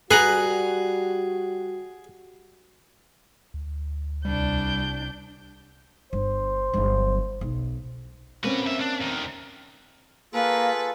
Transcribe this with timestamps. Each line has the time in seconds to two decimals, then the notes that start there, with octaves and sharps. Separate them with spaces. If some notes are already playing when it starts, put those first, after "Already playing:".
0.11 G3 F#4 G#4 B4 F#5 A#5
3.54 D2
4.25 C2 G3 D4 G6
6.13 G1 C5
6.74 G1 F#3
7.41 B1
8.44 A#3 C4 C#4 F#4 B4
8.66 F#2 E5
8.80 D4
9.01 D2 D#3
10.33 A#3 F4 G#4 A4 B4